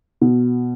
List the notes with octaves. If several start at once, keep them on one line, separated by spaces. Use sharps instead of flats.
B2